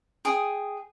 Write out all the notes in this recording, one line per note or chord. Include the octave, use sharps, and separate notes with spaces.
G#4 G5 D#6